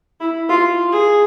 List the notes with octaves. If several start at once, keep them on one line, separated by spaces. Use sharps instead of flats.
E4
F4
G#4